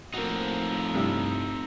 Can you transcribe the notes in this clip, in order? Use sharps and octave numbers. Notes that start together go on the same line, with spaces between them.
A2 F3 A#3 C4 D#4 F#4
G2 C3 G3 E4